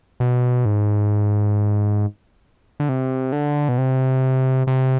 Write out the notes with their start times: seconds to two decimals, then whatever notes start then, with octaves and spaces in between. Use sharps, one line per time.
0.20 B2
0.65 G#2
2.80 D3
2.89 C3
3.32 D3
3.69 B2
3.78 C3
4.67 C3